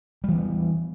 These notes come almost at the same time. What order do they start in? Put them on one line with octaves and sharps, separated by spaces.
G3 E3 B3